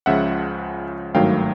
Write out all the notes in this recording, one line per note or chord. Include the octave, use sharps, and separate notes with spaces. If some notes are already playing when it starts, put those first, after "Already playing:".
C#2 C#3 F3 G#3 E5 F#5
G#1 G2 D#3 F#3 A3 F5 G5